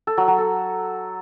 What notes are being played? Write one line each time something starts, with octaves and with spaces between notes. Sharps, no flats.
A4
F#3
F#3
A4